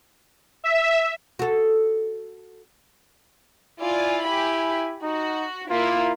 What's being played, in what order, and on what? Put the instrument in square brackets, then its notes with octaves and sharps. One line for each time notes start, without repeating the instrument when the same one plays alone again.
[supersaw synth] E5
[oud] F#4 A4
[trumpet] E4 [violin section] F4 D5 G#5
[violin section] G4 G#5 B5
[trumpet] D#4 [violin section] F#4
[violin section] A#3 E4 [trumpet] F4